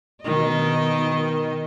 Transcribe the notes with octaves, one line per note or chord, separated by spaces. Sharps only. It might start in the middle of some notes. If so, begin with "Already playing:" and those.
B2 D#3 D#5